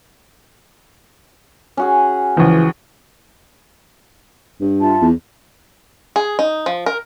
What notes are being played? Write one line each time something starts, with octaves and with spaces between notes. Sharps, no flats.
C#4 F#4 G#4
C#2 E3 F3
G2
F4 E5 A5
E2
G#4
D#4
F3
A#4